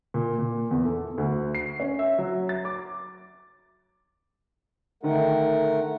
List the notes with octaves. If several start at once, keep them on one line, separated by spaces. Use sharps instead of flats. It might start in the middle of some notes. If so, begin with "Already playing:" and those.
A#2
A#2
E2
A4
D2
C7
C#4
E5
F#3
A6
D6
D3 D#3 A3 A#4 F#5